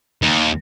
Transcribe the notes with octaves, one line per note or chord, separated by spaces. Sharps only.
D#2